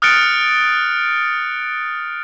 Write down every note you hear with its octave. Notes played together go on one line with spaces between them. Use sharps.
D#6 F6 F#6 A6 C#7 D7